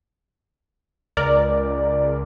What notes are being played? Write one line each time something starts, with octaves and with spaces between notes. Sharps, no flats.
C#2 A#4 D5